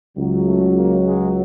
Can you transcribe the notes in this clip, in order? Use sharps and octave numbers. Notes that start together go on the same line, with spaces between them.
C#2 C#3 F#3
A3
A#3
G#3